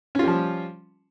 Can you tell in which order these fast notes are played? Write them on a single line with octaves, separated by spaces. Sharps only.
C#4 F4 G3 F3